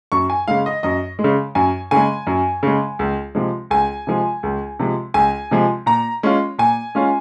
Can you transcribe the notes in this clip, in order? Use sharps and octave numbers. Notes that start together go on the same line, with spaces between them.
F#2 C#6
G#5
C#3 G#3 F5
D#5
F#2 D#5
G#3
C#3
F#2 G#5
C#3 G#3 G#5
F#2
C#3 G#3
C#2
C3 F3 G#3
C#2 G#5
C3 F3 G#3
C#2
C3 F3 G#3
C#2 G#5
C3 F3 G#3
A#2 A#5
G#3 C#4 F4
A#2 G#5
G#3 C#4 F4